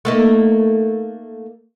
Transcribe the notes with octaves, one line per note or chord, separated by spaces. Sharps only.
A3 A#3 D#4